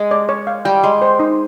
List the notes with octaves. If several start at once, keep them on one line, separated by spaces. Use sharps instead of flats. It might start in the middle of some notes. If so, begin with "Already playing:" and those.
Already playing: G#3
D5
C#5
F5
G3 G5
G#3 C6
C5
D#4